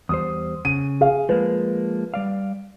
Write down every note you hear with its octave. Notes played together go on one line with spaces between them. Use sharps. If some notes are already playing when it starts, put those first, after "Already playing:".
E2 G3 C5 D#6
C#3 D#7
G#4 F5
F3 G#3 A#3 B4
G3 D5 F5